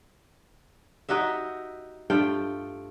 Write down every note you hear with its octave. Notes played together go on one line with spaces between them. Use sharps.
D#4 F#4 G4 E5
G2 A3 F4 G5